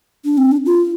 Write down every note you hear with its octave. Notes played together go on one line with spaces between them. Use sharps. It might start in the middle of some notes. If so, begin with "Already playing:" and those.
D4
C4
D4
F4